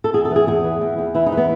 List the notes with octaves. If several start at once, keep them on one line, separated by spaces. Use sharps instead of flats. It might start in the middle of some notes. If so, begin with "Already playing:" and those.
A4
E2 G#4
A4
E3
G#4
E2 G#4
E3
E2
E2
E3 E4
D#4
E3
B3